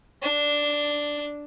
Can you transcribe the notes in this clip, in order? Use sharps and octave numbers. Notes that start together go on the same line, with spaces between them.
D4